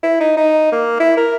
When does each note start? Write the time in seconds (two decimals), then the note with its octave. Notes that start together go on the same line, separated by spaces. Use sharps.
0.03 E4
0.20 D#4
0.37 D#4
0.72 A#3
1.00 E4
1.17 A#4